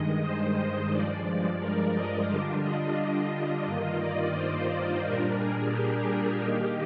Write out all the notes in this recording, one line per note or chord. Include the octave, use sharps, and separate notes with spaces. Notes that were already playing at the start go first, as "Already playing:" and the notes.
Already playing: G2 D#3 G#3 D#5
C5
G2 F3 G#3 D5
A#4
D#5
D3 G3 D4 F4
D#5
G2 D#3 A#3 F4 D#5
D5
C5
A#2 G3 D4 A#4
G#4
G4
D#3 A#3 D#4